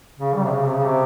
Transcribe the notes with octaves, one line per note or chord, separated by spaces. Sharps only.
C#3
G3
C3
C#3
C3
C#3
C3